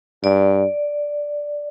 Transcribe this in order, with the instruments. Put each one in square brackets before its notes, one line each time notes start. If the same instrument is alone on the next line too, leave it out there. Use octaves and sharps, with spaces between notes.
[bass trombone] G2 [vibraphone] D5